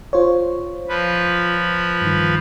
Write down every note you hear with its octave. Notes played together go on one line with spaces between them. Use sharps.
F4 C5 C#5
F3 B4
G2 D#3